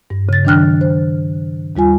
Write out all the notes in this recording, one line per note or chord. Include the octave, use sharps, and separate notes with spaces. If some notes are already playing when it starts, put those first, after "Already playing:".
G2
C#3 A6
D#3 F#3 D4 G5 F6 F#6
C5
D#2 G3 F4 G#5